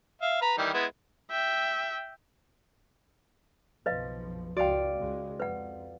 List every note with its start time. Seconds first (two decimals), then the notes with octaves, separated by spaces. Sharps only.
0.22 E5 F5
0.42 B4 A#5 B5
0.58 D#3 E3 G3
0.74 G#3 B3 E4
1.31 E5 G5
3.86 F#1 B1 F3 B4 D#5 F5
4.57 C#2 F#4 D5 F5 G5
4.97 C#2 C#3 G#3
5.40 F2 B4 F#5